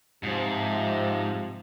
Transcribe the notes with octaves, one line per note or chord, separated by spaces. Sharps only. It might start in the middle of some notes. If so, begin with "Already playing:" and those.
G#2 C3 F3